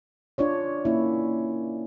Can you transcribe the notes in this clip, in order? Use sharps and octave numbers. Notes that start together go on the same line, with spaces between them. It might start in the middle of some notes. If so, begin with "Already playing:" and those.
D4 F4 C#5 D5
A#3 C#4 E4